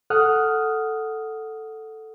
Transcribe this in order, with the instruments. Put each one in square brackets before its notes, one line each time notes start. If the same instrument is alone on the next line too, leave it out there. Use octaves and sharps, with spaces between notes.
[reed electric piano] A4 F#5 D#6 F6 F#6